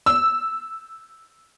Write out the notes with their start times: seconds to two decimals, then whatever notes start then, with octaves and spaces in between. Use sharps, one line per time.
0.06 E6